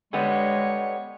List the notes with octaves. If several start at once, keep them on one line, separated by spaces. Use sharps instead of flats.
D3 G3 G#3 B3 C#5